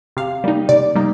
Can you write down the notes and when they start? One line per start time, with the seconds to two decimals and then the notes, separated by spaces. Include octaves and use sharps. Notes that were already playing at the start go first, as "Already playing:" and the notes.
0.17 C3 F5
0.44 G3 A#3 D#4
0.69 C3 D5
0.95 G3 A#3 D#4